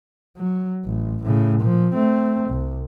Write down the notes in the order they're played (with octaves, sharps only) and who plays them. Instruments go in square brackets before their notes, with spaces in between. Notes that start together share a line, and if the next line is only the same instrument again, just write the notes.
[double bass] F#3
A1
A2 C#3
A#2 F3
A3 C4
C2